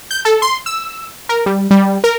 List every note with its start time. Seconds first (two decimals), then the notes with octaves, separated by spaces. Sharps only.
0.11 G6
0.25 A4
0.42 C6
0.66 E6
1.29 A#4
1.46 G3
1.71 G3
2.04 A#4